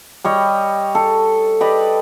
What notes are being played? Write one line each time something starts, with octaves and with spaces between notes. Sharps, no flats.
G3 C#5 D#5
A4
G4 B4 D5 D#5